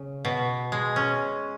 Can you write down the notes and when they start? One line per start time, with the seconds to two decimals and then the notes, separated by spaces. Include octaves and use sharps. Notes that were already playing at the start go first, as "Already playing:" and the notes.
Already playing: C#3
0.25 B2
0.72 G#3
0.96 C#4